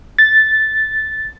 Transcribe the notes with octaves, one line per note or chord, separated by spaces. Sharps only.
A6